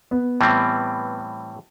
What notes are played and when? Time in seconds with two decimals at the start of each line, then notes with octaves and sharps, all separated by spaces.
0.11 B3
0.41 A2 E3 G3 C4